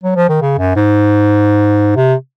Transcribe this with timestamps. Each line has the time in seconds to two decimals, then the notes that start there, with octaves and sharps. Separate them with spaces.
0.03 F#3
0.16 F3
0.29 D#3
0.42 C#3
0.58 F#2
0.76 G#2
1.96 C3